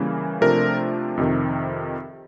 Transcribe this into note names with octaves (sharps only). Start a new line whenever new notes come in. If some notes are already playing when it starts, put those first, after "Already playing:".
Already playing: C#3 E3 G3 A#3 C#4
C3 F3 A3 D4 A#4
F2 C3 D#3